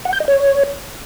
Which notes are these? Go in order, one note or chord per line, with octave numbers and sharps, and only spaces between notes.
F#5
G6
D#5
C#5